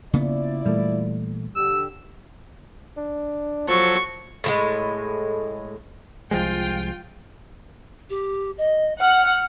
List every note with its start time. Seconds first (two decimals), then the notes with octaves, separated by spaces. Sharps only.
0.13 C#3 F3 A#3 B3 E4 D5
0.65 A#2 E3 G3 A3
1.56 D3 G4 E6
2.97 D4
3.68 F3 F#3 A4 C#6
4.44 A2 F3 G#3
6.31 C2 F3 G#3 F4 G5
8.10 G4
8.58 D#5
9.00 F#5 F6